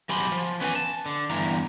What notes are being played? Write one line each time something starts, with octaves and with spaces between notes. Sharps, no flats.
F#3 G4 G#5 B5 C6
F3
B3 C#4 B4 F#5 G#5
A5
D3
E2 G2 E3 A#5